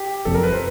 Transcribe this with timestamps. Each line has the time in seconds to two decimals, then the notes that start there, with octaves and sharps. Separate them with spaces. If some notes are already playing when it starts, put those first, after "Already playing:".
Already playing: G4
0.25 F#1 F2 C3 A4
0.34 A#4
0.43 B4
0.53 C5